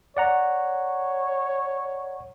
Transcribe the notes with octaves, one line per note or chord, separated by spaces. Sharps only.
C#5 D5 F#5 A#5